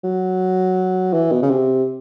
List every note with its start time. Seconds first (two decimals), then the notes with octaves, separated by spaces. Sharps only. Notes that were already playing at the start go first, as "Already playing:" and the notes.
0.04 F#3
1.13 E3
1.32 B2
1.42 C#3
1.50 C3